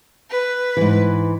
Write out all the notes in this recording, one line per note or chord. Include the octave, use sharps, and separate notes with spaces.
B4
G#2 E3